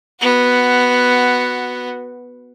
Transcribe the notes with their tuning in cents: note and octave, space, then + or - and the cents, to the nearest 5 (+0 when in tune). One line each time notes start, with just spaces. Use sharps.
B3 +0 F#4 +0